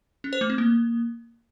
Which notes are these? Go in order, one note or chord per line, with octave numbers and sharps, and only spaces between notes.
C#4
C5
A3
C4
A#3